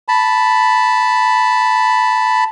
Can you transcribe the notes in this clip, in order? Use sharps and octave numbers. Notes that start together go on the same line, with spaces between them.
A5 B5